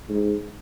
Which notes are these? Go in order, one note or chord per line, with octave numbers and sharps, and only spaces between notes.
G#2